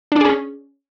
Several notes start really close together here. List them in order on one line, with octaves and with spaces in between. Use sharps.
D4 D5 G#4 C#4